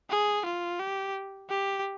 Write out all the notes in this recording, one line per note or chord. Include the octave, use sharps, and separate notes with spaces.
G#4
F4
G4
G4